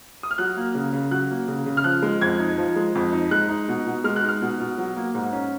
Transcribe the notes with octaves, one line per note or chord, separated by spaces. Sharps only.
D#6
F6
F#3 F#6
A#3
C#3
C#3
F#3 F#6
A#3
C#3
C#3
F6
F3 F#6
G#3
F2 G#6
D#4
F3
G#3
F2
D#4
G#3 F#6
D#4
B2
B2
G#3 F6
F#6
D#4
F6
B2
B2
F#3
A#3
G#2
C#4